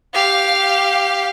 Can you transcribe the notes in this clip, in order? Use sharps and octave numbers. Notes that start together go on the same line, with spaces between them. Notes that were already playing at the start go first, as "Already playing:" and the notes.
G4 F5